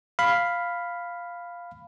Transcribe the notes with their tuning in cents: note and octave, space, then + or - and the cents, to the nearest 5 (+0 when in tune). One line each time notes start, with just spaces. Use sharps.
F5 +0 B5 +5